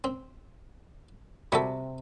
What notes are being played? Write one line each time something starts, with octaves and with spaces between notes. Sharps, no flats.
C4
C3 G3 F#4 A4